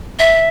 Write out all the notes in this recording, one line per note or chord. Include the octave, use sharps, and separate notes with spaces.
E5